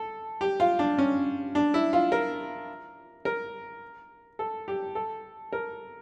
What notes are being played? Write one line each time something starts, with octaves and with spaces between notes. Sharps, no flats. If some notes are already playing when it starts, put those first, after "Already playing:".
Already playing: A4
G4
F4
D4
C#4
D4
E4
F4
A#4
A#4
A4
G4
A4
A#4